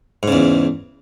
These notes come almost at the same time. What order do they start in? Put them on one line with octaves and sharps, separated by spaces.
G#2 C#3 E2